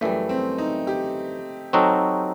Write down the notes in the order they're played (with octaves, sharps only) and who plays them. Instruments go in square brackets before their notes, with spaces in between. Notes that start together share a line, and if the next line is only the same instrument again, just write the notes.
[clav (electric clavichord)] F#2 E3 G3 [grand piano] A3
[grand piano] C4
D#4
G4
[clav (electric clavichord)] F#3 C4 D#4 F#4 A4